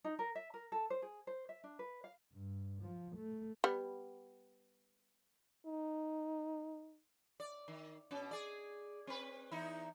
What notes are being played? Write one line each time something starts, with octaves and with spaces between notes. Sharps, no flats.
D#4
A#4
E5
A#4
A4
C5
G#4
C5
E5
D4
B4
F5
G2
F3
A3
G3 B3
D#4
D5
D#3
B2 C#4
G#4 D5
C4 B4
E2 D#4 E4